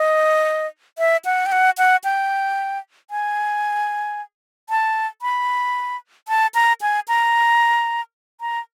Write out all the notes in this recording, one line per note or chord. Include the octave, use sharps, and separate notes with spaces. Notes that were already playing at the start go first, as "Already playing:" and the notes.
Already playing: D#5
E5
F#5
G5
F#5
F#5
G5
G#5
A5
B5
A5
A#5
G#5
A#5
A#5